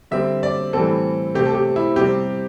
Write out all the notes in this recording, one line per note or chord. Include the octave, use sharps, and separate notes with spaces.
D3 G3 C4 E5
D5
A2 E3 G3 C4 A4
C3 A3 C4 G4
A4
G4
E4
C3 G3 C4 G4